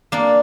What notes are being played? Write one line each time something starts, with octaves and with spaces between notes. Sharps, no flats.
A#3 D4